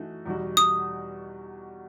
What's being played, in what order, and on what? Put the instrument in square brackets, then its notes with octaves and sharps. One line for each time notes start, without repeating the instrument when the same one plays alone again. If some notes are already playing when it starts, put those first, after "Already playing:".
Already playing: [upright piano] E3 A3 D#4 F#4
E2 B2 G3 D#4 F#4
[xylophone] D#6